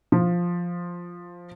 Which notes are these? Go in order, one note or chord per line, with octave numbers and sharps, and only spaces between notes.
F3